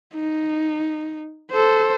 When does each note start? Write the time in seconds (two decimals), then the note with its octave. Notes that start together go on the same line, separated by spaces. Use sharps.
0.14 D#4
1.51 A4 C5